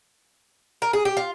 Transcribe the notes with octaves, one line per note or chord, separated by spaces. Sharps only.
A#4
G#4
G4
F4